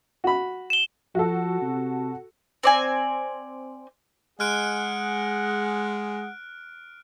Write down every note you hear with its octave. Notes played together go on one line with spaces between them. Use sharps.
F#4 B5
E7 G7
F3 F#4 A4
C3
C4 D5 G#5
G#3 G#4 F#5 F6 F#6 D7